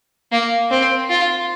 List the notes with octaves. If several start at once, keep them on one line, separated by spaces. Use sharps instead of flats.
A#3
C4
F4